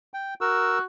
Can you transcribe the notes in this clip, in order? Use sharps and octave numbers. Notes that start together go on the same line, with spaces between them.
G5
F#4 A#4 E6